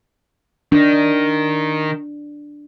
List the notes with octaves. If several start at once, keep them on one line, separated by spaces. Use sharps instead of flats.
D#3 D4 D#4